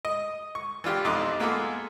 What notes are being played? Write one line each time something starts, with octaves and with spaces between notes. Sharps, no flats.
D#5
C#6
E3 D4 F4 G4
B1 F2 D#4 C6 D6 F#6
G#3 A#3 B3 F4 G#4 A4